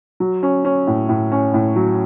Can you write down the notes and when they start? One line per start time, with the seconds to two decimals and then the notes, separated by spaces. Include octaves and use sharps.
0.20 F#3
0.43 C#4
0.65 C#4
0.87 A2
1.09 A2
1.32 C#4
1.54 A2
1.76 F#3